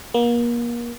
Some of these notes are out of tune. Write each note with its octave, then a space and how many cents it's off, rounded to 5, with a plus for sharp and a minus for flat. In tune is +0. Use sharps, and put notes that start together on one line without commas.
A#3 +35